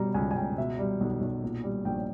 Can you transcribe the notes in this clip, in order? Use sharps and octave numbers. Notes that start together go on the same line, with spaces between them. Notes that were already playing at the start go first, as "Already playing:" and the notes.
Already playing: B2 G3 A#5
C#2 G#5
G#5
C#2 G5
B2 E5
G3
B1
B1
A#2
G3
A#1 G5